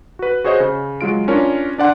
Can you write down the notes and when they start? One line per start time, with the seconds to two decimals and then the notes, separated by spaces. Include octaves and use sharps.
0.19 F#4 B4
0.44 F#4 G#4 C5 C#5 D#5
0.60 C#3
1.01 F#3 G#3 F4 D7
1.28 C#4 D4 F4 A#4 C#5
1.78 D4 D5 F#5 C6